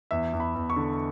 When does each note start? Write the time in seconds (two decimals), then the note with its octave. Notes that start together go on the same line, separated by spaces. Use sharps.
0.11 E2 E5
0.33 E2
0.40 B5
0.56 E2
0.70 C#6
0.76 D3